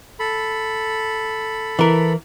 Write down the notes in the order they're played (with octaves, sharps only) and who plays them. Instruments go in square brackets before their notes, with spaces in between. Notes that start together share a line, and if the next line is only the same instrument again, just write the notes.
[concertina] A4 B5
[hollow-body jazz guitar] E3 A#4